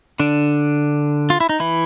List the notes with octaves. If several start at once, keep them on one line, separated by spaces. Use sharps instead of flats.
D3 D4
F4
E4
D#4
E3 E4